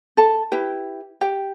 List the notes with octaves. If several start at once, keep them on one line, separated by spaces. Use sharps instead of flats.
A4 A5
E4 G4 B4 G5
G4 G5